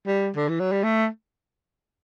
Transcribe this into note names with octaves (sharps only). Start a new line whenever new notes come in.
G3
D3
E3
F#3
G3
A3